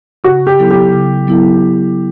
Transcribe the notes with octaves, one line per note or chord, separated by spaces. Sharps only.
C#3 F#4
G4
F#3 B3 E4 A4
G4
C#3
F#3 B3 E4 A4